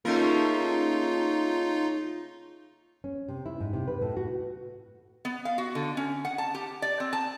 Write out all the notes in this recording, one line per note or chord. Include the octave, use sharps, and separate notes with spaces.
C#3 A3 A#3 C#4 D#4 F4 A#4
C#4
C3
E4
G#2
C3
B4
A2
F#4
B3
F5
F#4
D3
C#4
F#5
A5
G4
D5
C4
A5